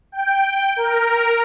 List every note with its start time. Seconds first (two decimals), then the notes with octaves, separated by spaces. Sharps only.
0.12 G5
0.76 A#4